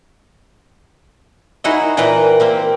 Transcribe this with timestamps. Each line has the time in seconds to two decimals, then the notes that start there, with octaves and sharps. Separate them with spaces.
1.64 D#4 E4 F#4 G#4 C#5 D#5
1.97 A#2 E3 B4 G5 A#5
2.40 A#3 C4 G4